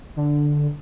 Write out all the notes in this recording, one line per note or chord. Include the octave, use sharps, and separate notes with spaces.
D3